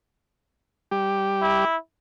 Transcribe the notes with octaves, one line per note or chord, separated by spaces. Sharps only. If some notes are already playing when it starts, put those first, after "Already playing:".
G3 G4
E4